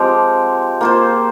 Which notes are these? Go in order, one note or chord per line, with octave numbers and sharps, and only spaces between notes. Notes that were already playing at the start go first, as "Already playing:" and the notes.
Already playing: F3 G#3 C4 G4
A#3 F4 C5